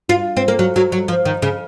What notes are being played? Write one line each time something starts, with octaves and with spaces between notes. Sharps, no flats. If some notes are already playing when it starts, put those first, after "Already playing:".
F4
C4
A#3
F#3
F#3
F#3
F3
D#3
C#3